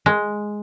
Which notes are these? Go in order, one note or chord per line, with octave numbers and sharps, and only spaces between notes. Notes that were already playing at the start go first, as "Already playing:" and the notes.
G#3